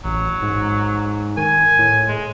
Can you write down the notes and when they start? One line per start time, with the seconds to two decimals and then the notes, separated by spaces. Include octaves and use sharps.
0.04 A1 F#3
0.42 G#2
1.37 D#3 G#5
1.79 A2
2.08 G#3